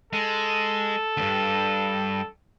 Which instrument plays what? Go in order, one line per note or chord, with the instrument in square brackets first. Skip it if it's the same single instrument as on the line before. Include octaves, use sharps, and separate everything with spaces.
[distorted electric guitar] G#3 [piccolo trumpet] A4
[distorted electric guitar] D2 G2